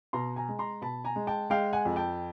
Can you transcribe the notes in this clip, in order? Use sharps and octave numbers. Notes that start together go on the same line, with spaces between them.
B2 A#5 C6
G#5 A#5
G#3
A#5 C6
B2 A5 B5
G#5 A#5
G#3
G5 A5
G#3 F5 G5
F#5 G#5
F2
G5 A5